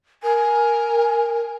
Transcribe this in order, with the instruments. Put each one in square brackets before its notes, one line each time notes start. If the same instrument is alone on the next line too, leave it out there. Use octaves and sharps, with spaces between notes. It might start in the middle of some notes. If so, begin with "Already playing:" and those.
[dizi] A#4 [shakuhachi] G#5